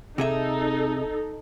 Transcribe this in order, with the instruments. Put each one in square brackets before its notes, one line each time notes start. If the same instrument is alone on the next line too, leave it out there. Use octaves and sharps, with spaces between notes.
[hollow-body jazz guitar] C3 G#4 E5 [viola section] D#4 A4